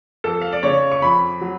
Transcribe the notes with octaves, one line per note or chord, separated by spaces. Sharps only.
F2 A4
F5
D5
C#3 C#5
C#6
F2 B5
F#3